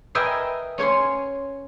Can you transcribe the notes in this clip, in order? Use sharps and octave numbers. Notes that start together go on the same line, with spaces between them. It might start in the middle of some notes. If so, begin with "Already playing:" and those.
A#4 B4 D#5 E5 G5 G#5
C#4 C#5 G#5 C6